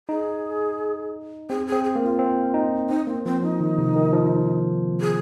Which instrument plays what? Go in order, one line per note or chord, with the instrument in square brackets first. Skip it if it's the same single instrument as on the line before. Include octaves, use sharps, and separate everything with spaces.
[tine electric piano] D#4 [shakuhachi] G#4
[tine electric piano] C4 [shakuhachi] G#4
[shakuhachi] G#4
[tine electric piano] C4
[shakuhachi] G#4
[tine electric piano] A#3
[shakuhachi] F4
[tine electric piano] C4
D#4
[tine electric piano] C4 [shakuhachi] D#4
[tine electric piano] A#3 [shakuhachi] C4
[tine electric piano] F3 [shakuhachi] C4
[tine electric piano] F3 [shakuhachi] D#4
[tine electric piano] D#3
C3
D#3
F3
[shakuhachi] G#4